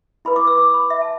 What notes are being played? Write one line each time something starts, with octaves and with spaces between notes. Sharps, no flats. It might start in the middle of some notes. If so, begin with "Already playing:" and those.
E4 B4 B5
D6
E6
D6
B5
E5
A5